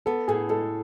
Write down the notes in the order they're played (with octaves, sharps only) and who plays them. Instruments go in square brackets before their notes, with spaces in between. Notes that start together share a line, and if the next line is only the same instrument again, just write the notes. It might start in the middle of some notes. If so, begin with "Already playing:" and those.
[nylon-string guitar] B3 [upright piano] A4
[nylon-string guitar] A2 [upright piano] G#4
[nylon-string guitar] G#3 [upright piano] A4